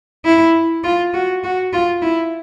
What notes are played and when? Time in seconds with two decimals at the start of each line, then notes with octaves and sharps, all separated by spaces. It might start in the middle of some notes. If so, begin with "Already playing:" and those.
0.25 E4
0.84 F4
1.14 F#4
1.44 F#4
1.73 F4
2.02 E4